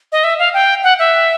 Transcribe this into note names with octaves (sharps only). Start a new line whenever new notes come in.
D#5
E5
F5
G5
F#5
E5